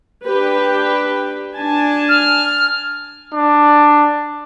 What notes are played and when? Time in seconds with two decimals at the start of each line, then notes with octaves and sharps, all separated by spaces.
0.25 D4 G4 B4
1.56 D4 G#5 A5
2.09 F6
3.34 D4